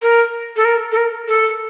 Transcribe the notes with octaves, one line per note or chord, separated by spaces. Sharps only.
A#4
A4
A#4
A4
A#4
A4